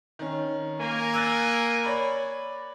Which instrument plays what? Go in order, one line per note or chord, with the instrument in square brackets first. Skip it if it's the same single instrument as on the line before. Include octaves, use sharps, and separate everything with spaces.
[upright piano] D#3 C#4
[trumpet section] A#3 A#4 G#5
[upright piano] E6 F#6 A6
C#5 D5 B5